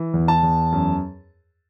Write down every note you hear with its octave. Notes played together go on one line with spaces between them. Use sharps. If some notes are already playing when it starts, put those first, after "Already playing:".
Already playing: E3
E2
A5
E2
F#2